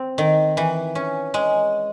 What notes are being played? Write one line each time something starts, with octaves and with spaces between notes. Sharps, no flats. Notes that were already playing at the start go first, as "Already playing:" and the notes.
Already playing: C4
D#3
E3
C#4
G#3